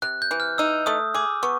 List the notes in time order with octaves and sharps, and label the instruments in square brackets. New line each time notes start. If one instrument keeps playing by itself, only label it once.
[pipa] C3 [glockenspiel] F#6
[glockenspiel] G6
[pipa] E3
[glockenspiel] F6
[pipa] D#4 [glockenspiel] E6
[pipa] A3 [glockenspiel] D#6
[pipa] G#4 [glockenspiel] D6
[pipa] B3 [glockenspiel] C#6